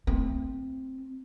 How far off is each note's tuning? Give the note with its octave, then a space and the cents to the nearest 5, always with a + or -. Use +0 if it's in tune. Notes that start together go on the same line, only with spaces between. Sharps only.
A3 +30 C4 +0